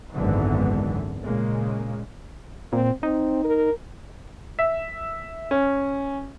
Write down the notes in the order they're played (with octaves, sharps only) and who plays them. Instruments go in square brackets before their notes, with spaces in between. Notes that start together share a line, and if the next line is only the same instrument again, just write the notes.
[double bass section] G#1 C#2 F#2 D3 E3 B3
A#2 C#3 G#3 A#3
[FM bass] A#2 [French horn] C4
[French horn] C4 [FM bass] D#4
[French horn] A#4
[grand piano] E5
C#4